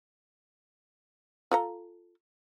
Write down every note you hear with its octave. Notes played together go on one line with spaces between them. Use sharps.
F4 A4 A#5